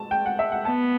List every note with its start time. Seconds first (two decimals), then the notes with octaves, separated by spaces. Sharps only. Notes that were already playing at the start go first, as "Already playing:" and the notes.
Already playing: A5
0.11 G5
0.26 F#5
0.39 E5
0.52 F#5
0.65 B3 A5